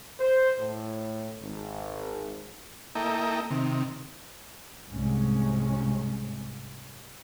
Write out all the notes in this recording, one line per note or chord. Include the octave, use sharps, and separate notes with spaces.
C5
A2
G#1
A#3 E4 A4 D#5 G5 A#5
C3 D#3
C2 G#2 C3 G#3 C#4